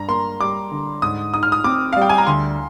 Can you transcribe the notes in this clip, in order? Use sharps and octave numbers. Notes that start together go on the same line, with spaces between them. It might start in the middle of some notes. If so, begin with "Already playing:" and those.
Already playing: G2 A#5
A#3 C6
G3 D6
D3
G#2 D#6
D#4 D#6
F6
D#6
C4 D6
F5
G3
G5
G#5
A#5
D2 C6